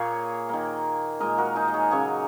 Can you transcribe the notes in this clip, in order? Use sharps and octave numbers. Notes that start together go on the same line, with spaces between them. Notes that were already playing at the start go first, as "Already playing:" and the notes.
Already playing: A#2 A#3 G#4 C#5
D#3 A#3
A#2 G#3 A#4 D#5
F#4 A#4
D#4 G#4
D#5
G#4 C#5
C#3 F#3 A#3 G#4 C#5